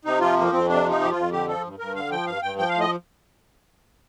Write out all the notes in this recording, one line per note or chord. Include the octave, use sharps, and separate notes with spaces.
C3 D#4
F3 F4
F2 A#3
F2 C4
C3 D4
F3
D#4
F2 G4
F4
F2
D3 G4
F3 A4
G2
G2 A#4
D3 F5
F3 G5
G2 F5
G2 G5
F3 G5
F5
A2
D#5